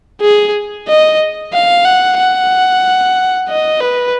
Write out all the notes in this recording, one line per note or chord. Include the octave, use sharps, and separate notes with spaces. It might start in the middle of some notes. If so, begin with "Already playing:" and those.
G#4
D#5
F5
F#5
F#5
D#5
B4